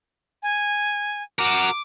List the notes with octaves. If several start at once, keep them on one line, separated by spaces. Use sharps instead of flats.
G#5
F#4 A#4 D6